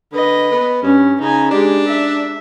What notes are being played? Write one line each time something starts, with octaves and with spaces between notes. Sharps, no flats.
D3 B4 D#5
B3
G2 C#4
C#3 D#4 G#5
G#3 D4 G4
E5